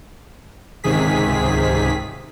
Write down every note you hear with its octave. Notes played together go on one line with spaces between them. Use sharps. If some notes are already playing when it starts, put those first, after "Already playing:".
C#2 G#2 C3 D#3 G#4 B6